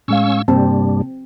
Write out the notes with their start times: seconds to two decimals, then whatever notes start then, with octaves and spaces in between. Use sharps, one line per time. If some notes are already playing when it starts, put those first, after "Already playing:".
0.08 A2 G#3 C#4 F5 C#6 E6
0.48 G2 C3 G3 A#3 C4 A5